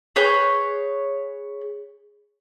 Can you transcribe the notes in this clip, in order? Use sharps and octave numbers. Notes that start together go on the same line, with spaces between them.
G#4 B4 C#5 G6